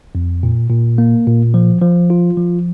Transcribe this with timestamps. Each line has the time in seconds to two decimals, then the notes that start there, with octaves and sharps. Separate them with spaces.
0.15 F2
0.43 A#2
0.70 A#2
0.98 A#3
1.27 A#2
1.54 F3
1.82 F3
2.10 F4
2.37 F3